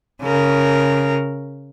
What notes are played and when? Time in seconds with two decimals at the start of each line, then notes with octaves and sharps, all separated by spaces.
0.23 C#3 A#4